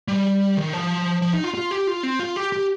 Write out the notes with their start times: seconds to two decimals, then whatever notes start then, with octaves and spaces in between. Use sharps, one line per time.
0.08 G3
0.57 D#3
0.73 F3
1.22 F3
1.33 D#4
1.44 F4
1.55 F4
1.71 G4
1.87 F4
2.03 C4
2.20 F4
2.36 G4
2.52 G4